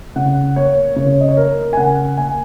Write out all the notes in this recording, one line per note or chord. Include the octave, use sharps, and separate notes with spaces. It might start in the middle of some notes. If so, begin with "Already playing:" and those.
C#3 F#5
A#3 C#5
C#3 C#5
D#5
C#5
A#3 A#4
G#5
C#3 F#5
A#3 G#5